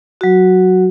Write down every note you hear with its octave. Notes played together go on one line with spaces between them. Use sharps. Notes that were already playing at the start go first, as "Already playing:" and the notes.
F#3 F#4